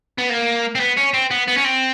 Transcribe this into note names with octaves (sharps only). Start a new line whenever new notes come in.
B3
A#3
C4
B3
C#4
C4
B3
B3
C#4
C4